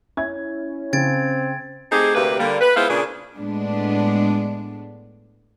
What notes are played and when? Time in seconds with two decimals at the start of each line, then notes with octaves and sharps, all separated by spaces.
0.17 C#4 E4 G#6
0.93 C#3 C4 G#6 A6 D7
1.91 A3 C4 D#4 G4 G#4
2.15 D2 C3 A#3 E4 G4 B4
2.39 D3 G3 A#3
2.61 B4
2.76 G#3 B3 E4 F4 C5 F5
2.89 A#2 C#3 D4 G#4
3.35 A2 G#3 B3 D4